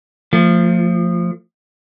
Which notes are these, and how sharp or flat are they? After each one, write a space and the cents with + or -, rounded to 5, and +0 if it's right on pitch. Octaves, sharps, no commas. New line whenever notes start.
F3 +0 A3 +40